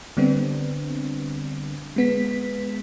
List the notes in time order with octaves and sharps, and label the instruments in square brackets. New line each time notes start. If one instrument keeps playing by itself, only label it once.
[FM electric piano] D3 G3 B3 C4 D4
G#3 B3 B6